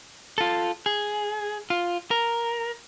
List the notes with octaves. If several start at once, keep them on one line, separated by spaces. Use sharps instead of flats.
F4 A4
G#4
F4
A#4